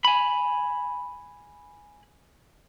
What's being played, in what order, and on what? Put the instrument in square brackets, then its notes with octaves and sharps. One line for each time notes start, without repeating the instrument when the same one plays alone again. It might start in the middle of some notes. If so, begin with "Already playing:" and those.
[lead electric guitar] G#5 B5